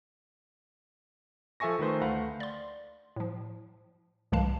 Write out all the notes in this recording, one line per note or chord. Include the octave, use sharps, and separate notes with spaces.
F3 A4 E5 G#5 C#6 A#6
D#3 A3 B4 C5
D2 A3 F5 F#5 B5
D5 C6
A2 F3
C2 G#2 E3 G#3 F5 A5